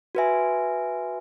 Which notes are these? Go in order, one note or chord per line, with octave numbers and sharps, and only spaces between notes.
F#4 B4 E5 G#5